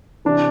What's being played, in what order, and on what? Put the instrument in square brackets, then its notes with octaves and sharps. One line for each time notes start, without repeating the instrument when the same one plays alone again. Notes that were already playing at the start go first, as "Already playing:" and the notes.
[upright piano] C3 E3 D4